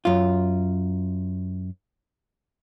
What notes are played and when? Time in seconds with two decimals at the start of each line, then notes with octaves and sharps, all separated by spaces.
0.05 F#2 F4